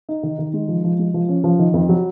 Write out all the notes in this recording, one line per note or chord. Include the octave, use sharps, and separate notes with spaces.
D#4
D#3
D#3
G#3
F3
F3
G#3
F3
C#4
F3
D#3
F2
F#3